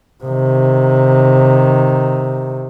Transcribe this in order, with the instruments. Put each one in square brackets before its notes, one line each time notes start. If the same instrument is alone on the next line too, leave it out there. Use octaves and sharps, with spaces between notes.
[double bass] C3 D#3